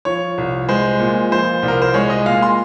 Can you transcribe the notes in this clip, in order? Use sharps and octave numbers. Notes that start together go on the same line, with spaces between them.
F3 C#5
C2
G#3 C5
A#2
F3 C5
C2
A#4
C5
G#3 C#5
D#5
A#2 F5
C6